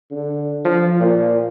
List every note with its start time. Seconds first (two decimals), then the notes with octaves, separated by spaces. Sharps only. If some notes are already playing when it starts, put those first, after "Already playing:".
0.11 D3
0.65 F3
1.00 A#2